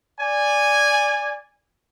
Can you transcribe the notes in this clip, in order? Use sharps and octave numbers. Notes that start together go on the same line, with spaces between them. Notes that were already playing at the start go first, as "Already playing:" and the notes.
D5 G#5